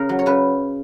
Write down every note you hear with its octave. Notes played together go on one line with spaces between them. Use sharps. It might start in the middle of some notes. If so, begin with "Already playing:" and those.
Already playing: C#3 A#4
F#3
C#5
C#3 B4